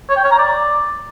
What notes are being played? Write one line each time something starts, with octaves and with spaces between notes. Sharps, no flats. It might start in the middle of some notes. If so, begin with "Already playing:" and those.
C#5
G5
C#5
A#5
D5